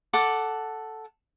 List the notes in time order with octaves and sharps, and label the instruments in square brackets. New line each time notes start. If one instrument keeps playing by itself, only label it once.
[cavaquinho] A4 F#5 D6